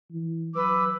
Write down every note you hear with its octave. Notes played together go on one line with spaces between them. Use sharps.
E3
F#3 B4 D6 E6